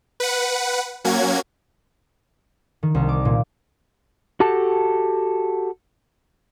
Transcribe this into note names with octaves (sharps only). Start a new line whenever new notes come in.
B4 F#5
F#3 A#3 C#4 F#4 G#6
D#3
C2
D6
A#2
F#4 G4 A4 A5